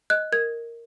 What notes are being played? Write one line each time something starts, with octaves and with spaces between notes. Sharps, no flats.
D#5 F#6
A#4 G#6